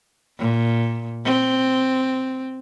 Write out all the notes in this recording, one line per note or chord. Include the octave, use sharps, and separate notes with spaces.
A#2
C4